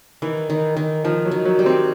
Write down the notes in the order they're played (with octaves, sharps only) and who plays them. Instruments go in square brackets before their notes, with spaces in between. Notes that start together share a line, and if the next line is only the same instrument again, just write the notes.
[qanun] D#3 [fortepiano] E3
[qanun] D#3
D#3
[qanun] D#3 [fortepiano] F3
[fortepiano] F#3
[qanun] D#3
[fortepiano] F#3
[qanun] G3
[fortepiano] C4